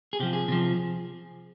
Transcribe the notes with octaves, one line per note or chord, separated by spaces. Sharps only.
G#4
C3 F3 G4
G#4
C3 F3